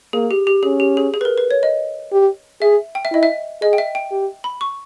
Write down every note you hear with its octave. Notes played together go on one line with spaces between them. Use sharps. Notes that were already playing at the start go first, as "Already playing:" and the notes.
A#3 G#4
G4
G4
C#4 G#4
G4
G#4
G#4
B4
A#4
B4
C#5
D#5
G4
G#4 E5
G5
E5
E4 D#5
E5
G#4 D#5
G5
E5
G5
G4
B5
C#6